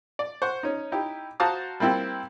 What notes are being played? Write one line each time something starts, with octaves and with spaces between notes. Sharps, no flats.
D5
C5 F#5 C#6
C#4 D#4
D#4 E4 G4
F#4 C5 F5 A5 A#5 D#6
G3 A#3 C4 E4 G4